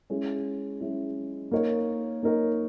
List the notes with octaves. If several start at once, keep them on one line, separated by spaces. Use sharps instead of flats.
G#3 C#4 E4
G#3 C#4 E4
A#3 D#4 A#4 C#5
A#3 D#4 A#4 C#5